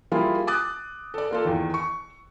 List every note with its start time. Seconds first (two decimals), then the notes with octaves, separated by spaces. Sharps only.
0.12 G3 A#3 E4 F4 G#4
0.47 D6 D#6 F#6 A6
1.14 A4 D5
1.31 A#3 F4 A4
1.45 E2 D#3
1.74 C#6